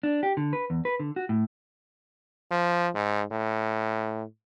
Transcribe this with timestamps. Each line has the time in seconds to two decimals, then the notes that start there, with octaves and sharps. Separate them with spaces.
0.03 D4
0.23 G4
0.37 D3
0.53 B4
0.70 E2
0.85 B4
1.00 D3
1.16 F#4
1.29 A2
2.51 F3
2.95 G#2
3.31 A2